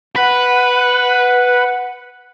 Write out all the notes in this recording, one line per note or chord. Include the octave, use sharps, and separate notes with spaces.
B4 F#5